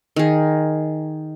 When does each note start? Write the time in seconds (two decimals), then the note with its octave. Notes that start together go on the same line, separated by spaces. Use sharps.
0.16 D#3 G#4